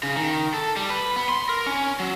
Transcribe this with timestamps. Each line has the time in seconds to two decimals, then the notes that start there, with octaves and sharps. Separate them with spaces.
0.03 C#3
0.17 D#3
0.54 A4
0.76 G3
0.90 B4
1.16 B3
1.29 C6
1.49 A#4
1.67 C#4
2.00 F#3